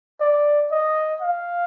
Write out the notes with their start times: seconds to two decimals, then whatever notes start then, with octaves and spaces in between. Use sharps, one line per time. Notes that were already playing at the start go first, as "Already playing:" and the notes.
0.21 D5
0.71 D#5
1.22 F5